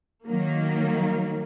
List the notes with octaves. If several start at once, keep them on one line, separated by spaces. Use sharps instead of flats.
D#3 F#3 A#3